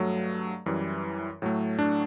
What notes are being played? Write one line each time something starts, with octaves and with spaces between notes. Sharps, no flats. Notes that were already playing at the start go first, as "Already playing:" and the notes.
Already playing: G2 F#3 A3
F#2 E3 G3
A2 F#3 A3
D4